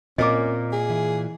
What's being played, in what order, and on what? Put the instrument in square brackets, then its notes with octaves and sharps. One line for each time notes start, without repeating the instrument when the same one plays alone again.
[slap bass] A#2 [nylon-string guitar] A#3 C4 A#4 [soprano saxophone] C#4 [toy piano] D#5 D6
[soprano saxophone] G#4
[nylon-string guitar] E3